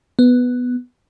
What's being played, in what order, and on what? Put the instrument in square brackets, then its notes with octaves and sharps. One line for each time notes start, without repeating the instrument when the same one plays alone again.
[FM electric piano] B3